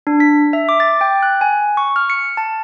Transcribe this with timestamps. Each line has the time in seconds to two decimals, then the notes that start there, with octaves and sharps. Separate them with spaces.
0.07 D4
0.20 B6
0.53 E5
0.69 D6
0.80 A6
1.01 G5
1.23 F#6
1.41 G#5
1.77 C#6
1.96 F6
2.10 C#7
2.37 A5